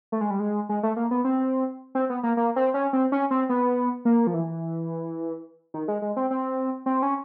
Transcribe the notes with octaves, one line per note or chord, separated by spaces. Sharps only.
A3
G#3
G3
G#3
G#3
A3
A#3
B3
C4
C4
B3
A#3
A#3
C4
C#4
C4
C#4
C4
B3
A#3
F3
E3
D#3
G#3
G#3
C4
C4
C4
C#4